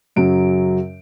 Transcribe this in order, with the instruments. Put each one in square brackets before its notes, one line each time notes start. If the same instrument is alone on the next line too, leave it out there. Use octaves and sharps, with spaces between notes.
[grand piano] F#2 C#3 F#3 D7